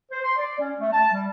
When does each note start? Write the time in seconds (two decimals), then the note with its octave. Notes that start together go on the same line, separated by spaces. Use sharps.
0.11 C5
0.23 C6
0.37 D5
0.59 C#4
0.80 A3
0.92 A5
1.13 G3